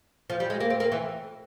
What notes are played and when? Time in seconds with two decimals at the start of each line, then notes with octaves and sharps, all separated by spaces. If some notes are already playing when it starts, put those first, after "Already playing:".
0.30 F3
0.40 G3
0.50 G#3
0.60 A#3
0.70 C4
0.80 A#3
0.92 E3